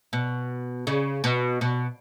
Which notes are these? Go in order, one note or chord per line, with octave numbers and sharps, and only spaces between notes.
B2
C#3
B2
B2